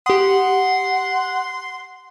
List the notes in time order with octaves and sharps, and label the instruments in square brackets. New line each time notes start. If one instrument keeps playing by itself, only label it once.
[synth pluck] G4 D#6 [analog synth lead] F#5 [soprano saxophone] C6